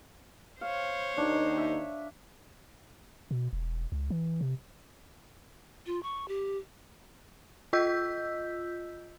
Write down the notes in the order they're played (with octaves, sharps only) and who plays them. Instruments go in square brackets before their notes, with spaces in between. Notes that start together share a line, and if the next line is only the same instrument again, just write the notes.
[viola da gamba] C5 C#5 [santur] F5
[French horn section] D#2 D#4 [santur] D4
[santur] E5
[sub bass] B2
E1
C#2
E3
C3
[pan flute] F4
C#6
G4
[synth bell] F4 D#5 E6 G6 B6